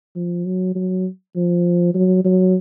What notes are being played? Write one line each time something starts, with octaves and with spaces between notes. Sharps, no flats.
F3
F#3
F#3
F3
F#3
F#3